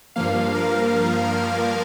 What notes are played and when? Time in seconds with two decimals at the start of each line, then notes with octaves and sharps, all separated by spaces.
0.16 G2 F3 A#3 F5
0.55 A#4